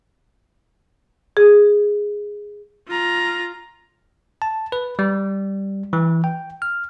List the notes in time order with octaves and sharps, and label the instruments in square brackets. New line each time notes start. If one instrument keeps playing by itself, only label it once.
[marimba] G#4
[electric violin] F4 A#5
[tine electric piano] A5
B4
G3
E3
G5
F6